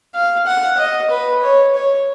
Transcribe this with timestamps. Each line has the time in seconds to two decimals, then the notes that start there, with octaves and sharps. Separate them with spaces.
0.15 F5
0.47 F#5
0.78 D#5
1.11 B4
1.43 C#5
1.75 C#5